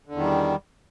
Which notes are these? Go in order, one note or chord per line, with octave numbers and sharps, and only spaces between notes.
E2 D3 D#3 G3